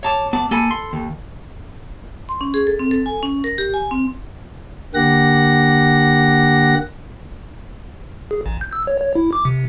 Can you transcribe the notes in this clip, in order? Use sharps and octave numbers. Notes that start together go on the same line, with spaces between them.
C#5 A5 D6
B3 D5 A5
A#3 A4 G#5 B5
C6
D#2
C6
C#4
G#4
A4
C4
A4
G#5
C#4
A#4
G4
G#5
C4
D3 A#3 G4 F#5 A#6
G#4
A1
G6
E6
C#5
C#5
E4
D6
C3